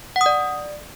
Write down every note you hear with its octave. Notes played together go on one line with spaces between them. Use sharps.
F#5
D#6
D5